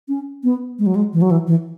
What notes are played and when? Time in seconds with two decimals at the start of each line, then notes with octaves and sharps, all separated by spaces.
0.08 C#4
0.44 B3
0.79 G#3
0.86 F#3
0.96 G#3
1.13 E3
1.22 F#3
1.31 E3
1.47 E3